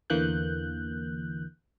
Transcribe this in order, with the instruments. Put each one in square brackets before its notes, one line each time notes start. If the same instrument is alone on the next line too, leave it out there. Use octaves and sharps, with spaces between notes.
[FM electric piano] E2 D3 E3 A#3 F#6 G6